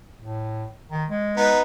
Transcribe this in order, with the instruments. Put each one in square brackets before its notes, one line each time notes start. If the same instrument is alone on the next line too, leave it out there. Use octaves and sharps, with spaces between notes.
[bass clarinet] A2
D#3
G#3
[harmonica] B3 D#4